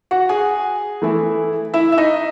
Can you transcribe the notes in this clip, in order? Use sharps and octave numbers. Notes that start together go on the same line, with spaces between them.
F#4 F#5
G#4 G#5
E3 A3 E4
E4 E5
E5
D#4 D#5